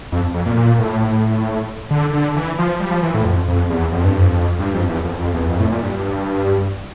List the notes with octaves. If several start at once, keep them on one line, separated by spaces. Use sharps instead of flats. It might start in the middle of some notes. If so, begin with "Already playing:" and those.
F2
F2
A#2
A#2
A2
D3
D3
E3
F3
G3
F3
E3
A2
F2
F2
E2
F2
G2
F2
G2
F2
E2
F2
F2
E2
F2
A2
A#2
G2